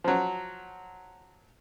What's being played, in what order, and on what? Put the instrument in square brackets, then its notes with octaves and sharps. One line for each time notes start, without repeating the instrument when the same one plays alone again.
[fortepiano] F3 F#3